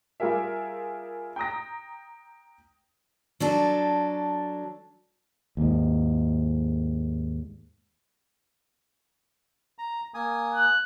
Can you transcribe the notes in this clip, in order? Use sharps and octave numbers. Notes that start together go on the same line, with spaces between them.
G3 F4 G#4 A#4 E5
G5 A#5 D#6 A#6
F#3 D4 A4
D#2 G#2
A#5
A#3 G#5 D#6
F#6